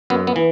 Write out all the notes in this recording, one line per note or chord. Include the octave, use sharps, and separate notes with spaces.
F#2 B3
B3
E3